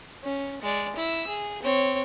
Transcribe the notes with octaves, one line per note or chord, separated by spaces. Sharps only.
C#4
G#3 D5
E4 E6
G#4
C4 C#5